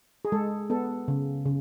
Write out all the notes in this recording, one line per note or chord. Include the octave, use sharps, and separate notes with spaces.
G#4
G#3 A4
B3 A4
C#3
C#3